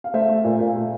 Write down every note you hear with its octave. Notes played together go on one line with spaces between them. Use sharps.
F5
A3 C5 E5
A3
A#2
A#2
A3